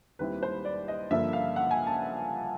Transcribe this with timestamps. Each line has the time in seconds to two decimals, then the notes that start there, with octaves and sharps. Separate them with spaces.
0.19 D#2 D#3 G3 C4 E4 B4
0.43 C5
0.65 D5
0.88 D#5
1.11 G2 D3 F3 A#3 E5
1.33 F5
1.56 F#5
1.71 G#5
1.87 A5